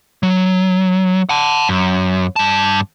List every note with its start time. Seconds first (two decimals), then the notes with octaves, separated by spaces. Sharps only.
0.23 F#3
1.29 F#5 A5
1.69 F#2
2.36 G2 A5